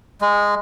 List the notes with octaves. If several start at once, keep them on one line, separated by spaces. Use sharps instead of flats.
G#3